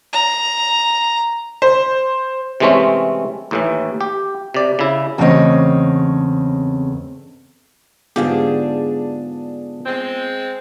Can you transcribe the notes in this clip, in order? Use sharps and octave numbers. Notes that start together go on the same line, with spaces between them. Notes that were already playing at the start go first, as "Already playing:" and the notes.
A#5
C5
C3 E3 G#3 A3 C4 C#4
D#2 A2 E3
G4
C3 D5
C#3 E4
E2 C#3 A3 C4 C#5 D#5
G#2 D3 B3 D4 F4 G4 G#4 F5
G#3 C4